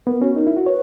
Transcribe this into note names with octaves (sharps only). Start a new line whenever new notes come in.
B3 A#4
C#4 F#4
D#4 A#4
E4
F#4
B4 C#5